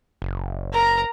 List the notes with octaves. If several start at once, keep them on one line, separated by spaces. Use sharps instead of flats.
F#1
A#4 A#5